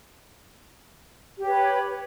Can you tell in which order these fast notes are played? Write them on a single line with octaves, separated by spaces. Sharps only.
G4 C#5 B4